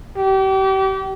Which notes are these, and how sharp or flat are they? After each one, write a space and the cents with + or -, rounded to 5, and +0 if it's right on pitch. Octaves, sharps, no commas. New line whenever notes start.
G4 -35